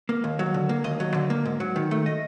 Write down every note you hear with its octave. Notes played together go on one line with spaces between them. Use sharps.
A#3
D#2
F#3
D3
A#3
D#2 D#5
F#3
D3
A#3
G#2
F#3
D#3
A3
D#5